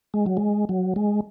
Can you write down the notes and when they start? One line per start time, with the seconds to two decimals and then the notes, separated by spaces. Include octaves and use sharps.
0.14 G#3
0.26 F#3
0.37 G#3
0.69 F#3
0.96 G#3